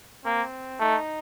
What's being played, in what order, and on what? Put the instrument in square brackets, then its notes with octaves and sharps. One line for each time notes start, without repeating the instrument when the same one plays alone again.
[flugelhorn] A#3 [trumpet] C4
[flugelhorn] A3 [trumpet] D#4